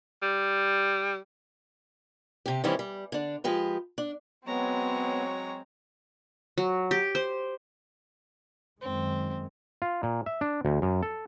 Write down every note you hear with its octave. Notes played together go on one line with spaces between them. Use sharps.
G3
C3 G4
D#3 E3 G3 C4 C#4 E4
G3
D3 D4
F3 G#3 G4 B4
D4
F#3 G#3 B3 C4 C#5 A#5
F#3
G4
C5
F#2 D#3 G#3 C4
F4
A#2
E5
D4
D2
F#2
A4